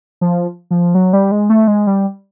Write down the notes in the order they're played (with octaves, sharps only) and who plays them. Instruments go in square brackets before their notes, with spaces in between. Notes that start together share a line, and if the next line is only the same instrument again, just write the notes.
[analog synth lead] F3
F3
F#3
G3
G#3
A3
G#3
G3